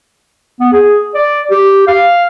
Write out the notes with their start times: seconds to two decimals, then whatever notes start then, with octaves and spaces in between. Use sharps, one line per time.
0.60 B3
0.72 G#4
1.14 D5
1.50 G4
1.87 F5